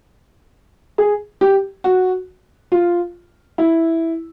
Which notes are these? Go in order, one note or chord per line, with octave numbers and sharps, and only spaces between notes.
G#4
G4
F#4
F4
E4